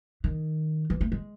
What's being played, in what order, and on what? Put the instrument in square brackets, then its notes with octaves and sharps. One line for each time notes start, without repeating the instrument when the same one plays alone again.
[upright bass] D#3
E3
A3
G#3